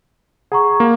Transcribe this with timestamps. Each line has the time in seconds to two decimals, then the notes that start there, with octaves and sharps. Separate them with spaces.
0.52 G#4 F#5 A#5 C#6
0.80 A#3